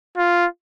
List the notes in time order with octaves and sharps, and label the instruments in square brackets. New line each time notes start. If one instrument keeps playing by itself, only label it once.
[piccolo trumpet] F4